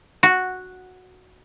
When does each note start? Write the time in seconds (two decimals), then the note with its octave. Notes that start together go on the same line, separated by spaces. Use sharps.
0.23 F#4